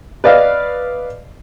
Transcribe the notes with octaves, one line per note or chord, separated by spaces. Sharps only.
B4 D5 D#5 F5